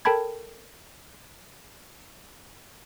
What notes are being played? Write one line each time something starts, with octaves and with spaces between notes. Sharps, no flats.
A4 A#4 G5 A5 B5 G#6